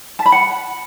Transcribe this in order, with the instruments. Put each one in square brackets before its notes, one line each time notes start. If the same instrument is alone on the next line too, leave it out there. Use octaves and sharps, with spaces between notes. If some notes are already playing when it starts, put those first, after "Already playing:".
[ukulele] A5
B5
F#5